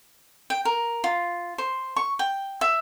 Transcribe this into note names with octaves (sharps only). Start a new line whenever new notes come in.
G5
A#4
F4
C5
C#6
G5
E5